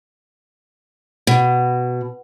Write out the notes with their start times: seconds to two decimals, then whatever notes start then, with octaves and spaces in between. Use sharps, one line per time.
1.27 B2